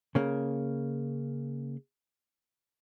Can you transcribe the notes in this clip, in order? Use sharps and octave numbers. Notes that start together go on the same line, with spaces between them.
C#3 A#3